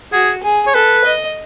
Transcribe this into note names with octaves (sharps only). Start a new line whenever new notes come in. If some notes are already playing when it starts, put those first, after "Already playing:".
F#4 G#4
G#4
C#5
A4 B4
D#5